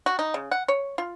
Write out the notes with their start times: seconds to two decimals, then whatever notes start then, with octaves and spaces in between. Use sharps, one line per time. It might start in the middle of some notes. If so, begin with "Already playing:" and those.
0.06 F#4
0.19 D#4
0.34 C#3
0.51 F#5
0.68 C#5
0.98 F4